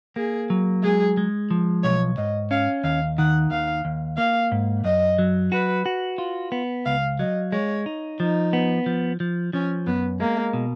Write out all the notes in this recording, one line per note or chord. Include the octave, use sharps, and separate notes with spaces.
A#3 G#4
F#3
G#3 G#4
G#3
F3
B1 C#5
G#2 D#5
C#4 F5
D#2 F5
D#3 F#5
D#2 F5
D#2
A#3 F5
G#2
F#2 D#5
F#3
F#4 B4
F#4
F4
B3
C#2 F5
F#3 D#5
G#3 C#5
D#4
F3 D#4
B3
F3
F3
F3 C#4
F#2 B3
G#3 A#3
B2